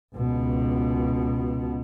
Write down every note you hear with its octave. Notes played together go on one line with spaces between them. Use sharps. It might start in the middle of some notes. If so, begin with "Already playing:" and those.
C#2 B2